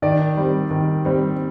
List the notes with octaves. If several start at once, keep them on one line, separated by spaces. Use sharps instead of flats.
D#3 D5
G3 C4
D#3
G3 C4